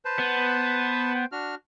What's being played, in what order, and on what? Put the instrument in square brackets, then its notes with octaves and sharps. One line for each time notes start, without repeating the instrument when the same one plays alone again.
[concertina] B4 C5 A5
[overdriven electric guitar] B3
[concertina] C5 G5
D4 F#4 F6